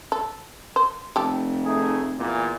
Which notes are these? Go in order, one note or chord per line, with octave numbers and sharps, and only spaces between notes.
A4
C5
F1 G4 A4
A3 D#4 G#4
E2 A#2